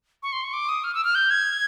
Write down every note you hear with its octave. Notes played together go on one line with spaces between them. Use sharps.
C#6
C6
C#6
D6
D#6
F6
E6
F6
G6
G#6